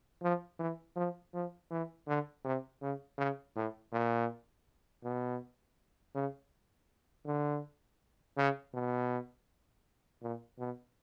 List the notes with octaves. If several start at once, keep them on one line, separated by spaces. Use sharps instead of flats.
F3
E3
F3
F3
E3
D3
C3
C#3
C#3
A2
A#2
B2
C#3
D3
C#3
B2
A#2
B2